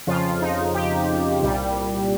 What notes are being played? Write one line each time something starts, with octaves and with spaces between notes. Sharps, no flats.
F2 C#3 F3 F4
D#4
G4
C2 A#2 G3